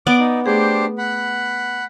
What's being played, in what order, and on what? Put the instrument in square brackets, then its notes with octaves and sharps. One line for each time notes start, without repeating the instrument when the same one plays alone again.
[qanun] B3 D5 [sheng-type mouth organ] D6
[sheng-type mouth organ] D#4
[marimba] A3 G#4 [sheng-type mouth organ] D4 G4 C5
[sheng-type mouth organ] F#5 B5